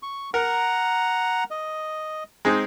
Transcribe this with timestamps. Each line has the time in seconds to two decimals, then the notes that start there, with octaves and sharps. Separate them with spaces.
0.03 C#6
0.34 A#4 F#5 A#5
1.51 D#5
2.45 G#3 C4 D#4